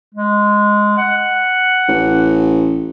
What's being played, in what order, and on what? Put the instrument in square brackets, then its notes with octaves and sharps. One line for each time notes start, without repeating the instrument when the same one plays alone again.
[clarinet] G#3
F#5
[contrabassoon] A1